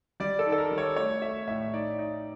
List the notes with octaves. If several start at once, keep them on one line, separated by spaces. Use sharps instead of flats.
G3 D5
A4
D#3
A4
A#4
G3
C#5
A3 C#5
A3 E5
A2 E5
D#4 D5
D#4